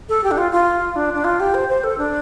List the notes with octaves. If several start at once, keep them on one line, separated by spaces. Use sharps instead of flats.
A4
G4
D4
F4
F4
D4
D4
F4
G4
C5
C5
A4
D4